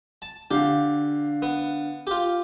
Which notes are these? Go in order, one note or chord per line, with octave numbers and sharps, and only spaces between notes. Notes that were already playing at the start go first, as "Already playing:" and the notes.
A5
D3 G4 F5
B3
F4 G4